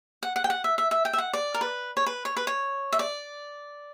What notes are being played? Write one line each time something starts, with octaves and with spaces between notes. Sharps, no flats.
F#5
F#5
G5
F#5
E5
E5
E5
G5
E5
F#5
D5
A#4
B4
C#5
B4
C#5
B4
C#5
E5
D5